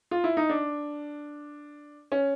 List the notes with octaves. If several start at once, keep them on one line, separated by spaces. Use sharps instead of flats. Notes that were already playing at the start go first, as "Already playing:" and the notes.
F4
E4
D#4
D4
C#4